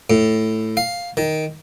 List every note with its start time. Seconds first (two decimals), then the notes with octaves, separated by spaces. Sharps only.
0.10 A2
0.77 F5
1.17 D#3